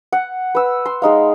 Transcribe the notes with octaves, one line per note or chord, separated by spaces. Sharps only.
F#5
B4 E6
C6
G#3 D#4 F5